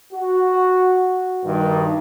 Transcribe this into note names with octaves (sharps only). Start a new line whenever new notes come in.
F#4
G2 D#3